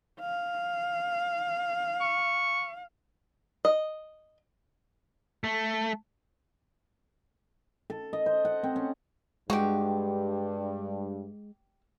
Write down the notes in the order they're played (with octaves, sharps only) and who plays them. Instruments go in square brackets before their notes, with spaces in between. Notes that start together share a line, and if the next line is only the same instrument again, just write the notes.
[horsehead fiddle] F5
[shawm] C#6
[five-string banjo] D#5
[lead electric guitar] A3
[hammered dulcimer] A4
D#5
C5
F#5
C4
C#4
[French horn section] G2 [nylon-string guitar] G#3 [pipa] F#4 G4